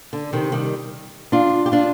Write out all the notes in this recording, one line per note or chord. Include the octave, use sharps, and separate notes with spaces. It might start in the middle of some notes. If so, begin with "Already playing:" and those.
D3
C3 D#3
D#3 G3
D4 F4
G4
D4 F4